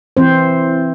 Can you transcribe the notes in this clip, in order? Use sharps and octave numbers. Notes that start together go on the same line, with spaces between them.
E3 C4 C5